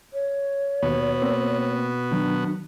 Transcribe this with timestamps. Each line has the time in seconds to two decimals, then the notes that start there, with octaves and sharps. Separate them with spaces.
0.13 C#5
0.82 D#2 B2 B3 F#4
1.22 A#3 C4
2.11 D#3 F#3 D4